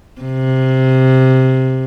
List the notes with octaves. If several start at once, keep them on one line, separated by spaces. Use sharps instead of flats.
C3